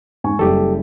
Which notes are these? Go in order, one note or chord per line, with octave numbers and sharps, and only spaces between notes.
G#2 G#5 C#6
F#1 G3 G4 A4